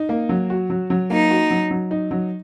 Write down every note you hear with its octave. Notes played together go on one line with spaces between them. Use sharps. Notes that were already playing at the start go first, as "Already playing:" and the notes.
Already playing: D#4
A#3
F#3
F#4
F#3
F#3
A#3 D#4
F#4
F#3
F#3
D#4
F#3